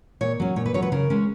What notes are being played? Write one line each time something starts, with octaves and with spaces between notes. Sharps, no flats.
A#2 C#5
F#3 C#4
A#2 C#5
B4
F#3 C#4 C#5
B4
C#3 A#4
G#3 C#4